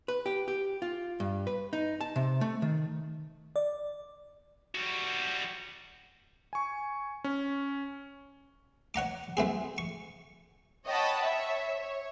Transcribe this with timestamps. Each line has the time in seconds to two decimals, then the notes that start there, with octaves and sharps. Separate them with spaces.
0.08 B4
0.26 G4
0.48 G4
0.82 F4
1.20 G2
1.47 B4
1.73 D#4
2.01 A5
2.16 C3
2.41 A3
2.62 D#3
3.56 D5
4.75 G3 F#4
6.53 G#5 C#6
7.24 C#4
8.94 C#5 F#5 A#5 D6
9.37 F#3 A3 C4 G#4
9.78 C#6
10.86 C#5 D#5 F#5 G5 A5 B5
11.21 C#5 E5
11.79 C#5